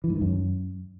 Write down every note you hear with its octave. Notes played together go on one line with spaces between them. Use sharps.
E3
G#2
D#3
F#2